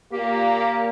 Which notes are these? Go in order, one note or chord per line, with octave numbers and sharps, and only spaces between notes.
A#2 A#3 G4